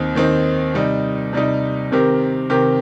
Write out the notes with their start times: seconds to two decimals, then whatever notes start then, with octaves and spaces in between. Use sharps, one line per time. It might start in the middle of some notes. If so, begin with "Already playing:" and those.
Already playing: D#2 D#3 C4 D#4
0.15 D#2 D#3 C4 D#4
0.74 C3 G3 D#4
1.33 C3 G3 D#4
1.92 C3 D#3 C4 G4 A#4
2.50 C3 D#3 C4 G4 A#4